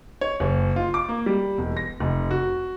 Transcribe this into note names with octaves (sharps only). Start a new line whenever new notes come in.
C#5
F#1
F4
D6
A#3
G3
E1
A#6
F1
F#4